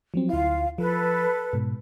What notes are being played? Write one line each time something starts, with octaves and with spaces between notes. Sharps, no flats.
F3 F#3 C4
D2 E4 F4 F5
F3 A4 B4
G#2 B2